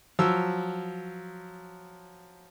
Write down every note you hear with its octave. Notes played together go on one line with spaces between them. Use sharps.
F3 F#3 E6